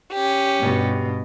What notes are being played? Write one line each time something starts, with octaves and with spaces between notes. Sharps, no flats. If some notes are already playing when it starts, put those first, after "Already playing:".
C#4 G4
G2 B2